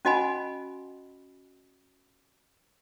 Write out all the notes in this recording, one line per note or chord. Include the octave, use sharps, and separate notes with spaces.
C#4 F#4 D#5 F#5 G#5 B5